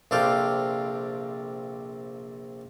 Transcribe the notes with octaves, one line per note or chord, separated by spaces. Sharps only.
A#1 C3 A4 D5 F5 G5